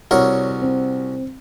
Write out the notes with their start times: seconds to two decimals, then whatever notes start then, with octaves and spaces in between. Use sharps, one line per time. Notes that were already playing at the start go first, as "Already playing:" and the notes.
0.11 C2 F#4 A#4 C#5
0.62 C4